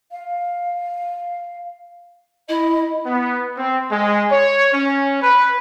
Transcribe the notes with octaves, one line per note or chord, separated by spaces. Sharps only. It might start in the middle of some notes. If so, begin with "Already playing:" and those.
F5
E4 D#5
B3
C4
G#3
C#5
C#4
B4